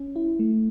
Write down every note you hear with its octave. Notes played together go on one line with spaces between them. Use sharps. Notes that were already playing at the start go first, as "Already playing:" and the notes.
Already playing: C#4
E4
A3